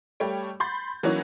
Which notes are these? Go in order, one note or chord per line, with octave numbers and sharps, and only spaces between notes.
G3 A3 C#5 G5
B5 C6 G6 A6
E3 F#3 A#3 C#4 D#4 C#5